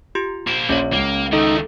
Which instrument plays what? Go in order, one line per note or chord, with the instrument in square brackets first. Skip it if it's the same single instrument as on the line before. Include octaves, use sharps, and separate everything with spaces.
[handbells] F4 G4 C6
[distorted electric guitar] A#3 C5 [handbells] D7
[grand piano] A#1 [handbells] C#4 C#5
[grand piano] C#2 [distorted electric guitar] A#3
[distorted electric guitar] D#3 A3 [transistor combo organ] D#4 [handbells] A4